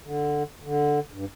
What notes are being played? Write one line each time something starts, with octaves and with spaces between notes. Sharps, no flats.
D3
D3
G2